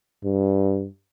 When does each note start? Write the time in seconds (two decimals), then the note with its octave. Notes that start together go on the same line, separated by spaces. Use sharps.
0.24 G2